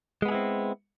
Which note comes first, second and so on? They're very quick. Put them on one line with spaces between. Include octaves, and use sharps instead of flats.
G#3 B3 G#4 E4 C4